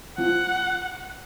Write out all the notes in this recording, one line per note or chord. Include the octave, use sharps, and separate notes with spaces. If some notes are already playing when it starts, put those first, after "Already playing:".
F3 F#5